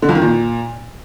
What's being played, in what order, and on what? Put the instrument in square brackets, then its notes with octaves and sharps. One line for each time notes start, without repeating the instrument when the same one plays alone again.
[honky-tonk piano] D3
F2
D#3
A#2